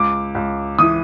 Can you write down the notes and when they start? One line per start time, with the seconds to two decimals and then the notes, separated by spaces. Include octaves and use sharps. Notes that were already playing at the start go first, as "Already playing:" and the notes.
Already playing: C#2 D6
0.35 C#2
0.79 E3 D#6